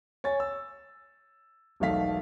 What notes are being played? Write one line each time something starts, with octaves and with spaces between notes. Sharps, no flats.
C#5 G#5 A6
E6
E1 B1 D#3 A3 F5 B6